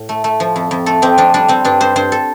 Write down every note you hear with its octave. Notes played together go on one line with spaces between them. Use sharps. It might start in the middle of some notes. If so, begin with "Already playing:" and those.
Already playing: A2
A3
A3
F3
F2
F2
A3 A4
F2 C4
F2 D4
G3 D4
G3 C4
G2 D4
G2 C5
G2 C5
A4